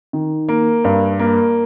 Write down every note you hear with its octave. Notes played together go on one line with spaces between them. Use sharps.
D#3
A#3
G2
A#3